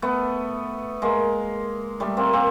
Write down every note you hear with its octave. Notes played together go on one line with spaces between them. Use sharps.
A3 B3
G#3 A#3
G3 A3
A#3 C4
A#3 C4